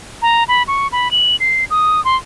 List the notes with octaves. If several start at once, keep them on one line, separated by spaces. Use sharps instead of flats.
A#5
B5
C#6
B5
F#7
C7
D#6
C6